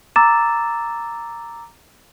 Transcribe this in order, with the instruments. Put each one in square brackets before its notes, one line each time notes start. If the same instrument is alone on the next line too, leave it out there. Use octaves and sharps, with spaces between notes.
[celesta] A#5 D6 E6 A6 E7